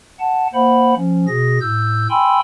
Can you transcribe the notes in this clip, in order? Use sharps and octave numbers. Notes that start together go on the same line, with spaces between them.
F#5 A5
A#3 C5 F#5 B5
F3 C#4
B2 G#4 A#6
A2 E6 G6
G5 G#5 B5 C6 E6